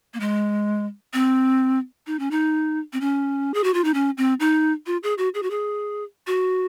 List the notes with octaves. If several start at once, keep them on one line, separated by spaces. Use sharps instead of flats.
A#3
G#3
C4
D#4
C#4
D#4
C4
C#4
G#4
F#4
F4
D#4
C#4
C4
D#4
F4
G#4
F#4
G#4
F#4
G#4
F#4